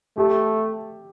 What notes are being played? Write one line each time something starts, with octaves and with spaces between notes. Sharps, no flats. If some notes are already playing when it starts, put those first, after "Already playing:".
A3 G4